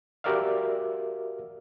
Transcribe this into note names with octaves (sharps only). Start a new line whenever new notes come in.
F#4 G4 A#4 D5 E5 F5